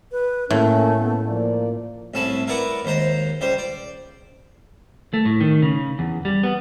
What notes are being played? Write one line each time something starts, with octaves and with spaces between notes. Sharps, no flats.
B4
A2 A3 A#3 C#4
B3
F3 A#3 D5
C2 A2 C#4 E5 A5 B5
E4 A#4 B4 D5 F#5 D6
D#2 G#2 C5 A#5
C#2 G3 C5
D5
A3
A2
D#3
C#3
E2
G3
B3